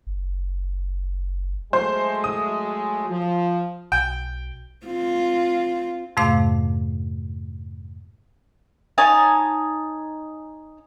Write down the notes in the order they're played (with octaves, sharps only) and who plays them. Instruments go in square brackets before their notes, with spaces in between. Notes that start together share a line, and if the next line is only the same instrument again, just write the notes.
[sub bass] F#1
[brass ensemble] F#3 G#3 A3 [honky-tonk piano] C5
[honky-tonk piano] D#6
[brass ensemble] F3
[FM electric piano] B1 [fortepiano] G5
[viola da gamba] C4 F4
[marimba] F2 G#2 C3 A3 F5 D6
[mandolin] D#4 C#5 G#5 A5